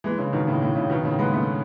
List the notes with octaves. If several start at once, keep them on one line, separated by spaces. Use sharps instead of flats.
E3 G#3
C#3 E3
B2 D#3
A2 C#3
A2
A2 C#3
B2 D#3
A2 C#3
G#3 B3
A3 C#4